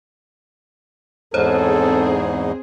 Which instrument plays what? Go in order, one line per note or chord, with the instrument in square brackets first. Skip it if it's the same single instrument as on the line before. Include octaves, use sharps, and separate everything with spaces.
[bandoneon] E2 G#2 D#4 [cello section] C4 G#4 [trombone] A4 [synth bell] C5 C#5